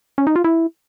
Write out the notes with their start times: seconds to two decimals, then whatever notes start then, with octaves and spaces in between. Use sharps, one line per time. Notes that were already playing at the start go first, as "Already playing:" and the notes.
0.18 C#4
0.27 D#4
0.36 F4
0.44 E4